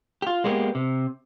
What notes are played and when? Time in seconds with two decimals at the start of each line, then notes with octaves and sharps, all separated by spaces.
0.22 F4 G4
0.44 G#3 A#3 B3 E4 G4
0.75 C3